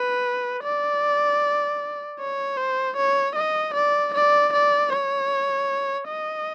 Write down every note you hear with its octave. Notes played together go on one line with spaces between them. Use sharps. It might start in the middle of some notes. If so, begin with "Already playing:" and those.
Already playing: B4
D5
C#5
C5
C#5
D#5
D5
D5
D5
C#5
D#5